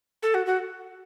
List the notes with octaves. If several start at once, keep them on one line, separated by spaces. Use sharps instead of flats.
A4
F#4
F#4